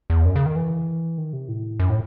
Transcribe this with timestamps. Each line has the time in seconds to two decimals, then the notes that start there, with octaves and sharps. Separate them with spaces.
0.10 E2
0.25 F#2
0.36 C#3
0.46 D#3
0.56 E3
1.18 D#3
1.33 C3
1.48 A2
1.80 F#2
1.90 A2